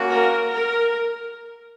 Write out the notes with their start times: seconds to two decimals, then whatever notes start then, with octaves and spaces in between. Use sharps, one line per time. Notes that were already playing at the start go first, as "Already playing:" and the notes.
Already playing: A#3 C#4 F#4
0.09 A#4
0.50 A#4